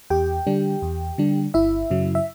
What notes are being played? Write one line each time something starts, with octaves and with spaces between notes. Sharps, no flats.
E2 G4 G5
D3 G3 D4
E2
D3 G3 D4
G1 E4 E5
F#2 C#3 F#3
E5